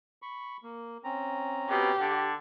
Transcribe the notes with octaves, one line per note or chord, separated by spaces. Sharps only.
B5 C#6
A#3
C4 C#4 A#5
B2 G4
D3